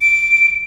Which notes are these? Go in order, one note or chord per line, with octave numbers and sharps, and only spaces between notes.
D7